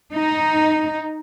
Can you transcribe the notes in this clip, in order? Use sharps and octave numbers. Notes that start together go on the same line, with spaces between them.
D#4